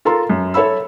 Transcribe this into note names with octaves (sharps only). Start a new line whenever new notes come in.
F4 A4 A#4 A#5 C6
F#2
A4 C#5 E5 B5 E6